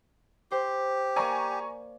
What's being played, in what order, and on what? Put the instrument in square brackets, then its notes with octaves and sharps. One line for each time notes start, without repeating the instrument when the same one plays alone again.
[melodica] G4 [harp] C5
[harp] A#3 D5 [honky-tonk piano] G#5 A#5 C#6